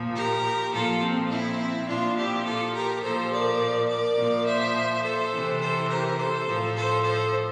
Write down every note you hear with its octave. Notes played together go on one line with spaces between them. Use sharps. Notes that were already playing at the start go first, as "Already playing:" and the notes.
Already playing: A#2 F3
G4 A#4
A#2 F3 F4 A4
C4
C4 E4
A#2 F3 D4 F4
E4 G4
F4 A4
G4 A#4
A#2 F3 A4 C5
A#4 D5
A#4 D5
A#2 F3
C5 E5
A4 C5
C3 E3
A4 C5
G4 A#4
A4 C5
A2 F3
A4 C5
A4 C5